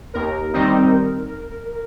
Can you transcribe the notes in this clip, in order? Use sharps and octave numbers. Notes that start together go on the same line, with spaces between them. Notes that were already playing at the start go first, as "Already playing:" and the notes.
D#2 A#4
D#3 G3 C4 D#4